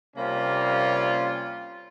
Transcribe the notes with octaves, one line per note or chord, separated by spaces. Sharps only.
C3 G3 A#3 C#4 F4